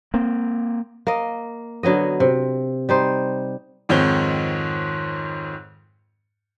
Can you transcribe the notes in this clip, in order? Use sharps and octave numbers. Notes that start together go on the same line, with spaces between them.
A#3 C4
A#3 D#5
D3 F#3 B3 D#5
C3
G3 D#4 C5
F2 G#2 D#3 C4 C#5 G7